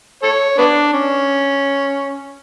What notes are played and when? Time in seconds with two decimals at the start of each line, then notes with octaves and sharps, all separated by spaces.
0.23 A4 C#5
0.58 B3 D4
0.93 C#4